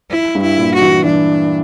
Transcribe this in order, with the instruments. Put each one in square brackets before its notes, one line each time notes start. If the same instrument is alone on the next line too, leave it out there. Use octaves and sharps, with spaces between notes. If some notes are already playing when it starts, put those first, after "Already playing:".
[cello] E4
[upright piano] G2
[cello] E4
[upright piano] A#2
[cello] F#4
[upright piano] E3
[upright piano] E3 [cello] D4